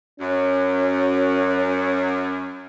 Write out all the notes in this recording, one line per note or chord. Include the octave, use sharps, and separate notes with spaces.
F#2 C#4